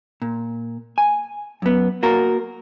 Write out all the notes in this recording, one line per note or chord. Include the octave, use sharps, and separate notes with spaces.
A#2
G#5
F#2 B3
A#3 F#4 A#4